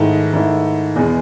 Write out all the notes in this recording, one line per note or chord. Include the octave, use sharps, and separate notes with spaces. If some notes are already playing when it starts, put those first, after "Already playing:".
Already playing: G#2 D#3 A3 E4
G#2 D#3 A3 E4
E2 B2 G#3 B3